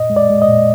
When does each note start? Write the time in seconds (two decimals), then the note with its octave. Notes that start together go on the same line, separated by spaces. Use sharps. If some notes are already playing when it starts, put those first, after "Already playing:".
Already playing: A#2 D#5
0.10 G#3
0.16 D5
0.30 G#3
0.42 D#5
0.48 A#2